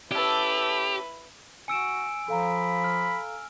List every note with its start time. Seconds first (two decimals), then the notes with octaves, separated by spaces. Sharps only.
0.11 C#4 E4 G4 A4 B4
1.68 F#4 G#5 E6 C#7 D7 E7
2.28 F3 A4 F5 A#5 B5
2.84 F6